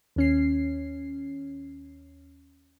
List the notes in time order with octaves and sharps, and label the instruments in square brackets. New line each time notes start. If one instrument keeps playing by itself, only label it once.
[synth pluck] D#2 C#4 C7